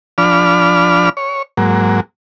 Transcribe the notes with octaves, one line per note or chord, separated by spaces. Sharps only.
F3 D4 D5 B5 F6
C#5
G#2 F#3 A#3